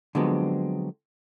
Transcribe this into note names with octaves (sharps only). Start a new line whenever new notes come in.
D3 F3 F#3 G#3 B3 C4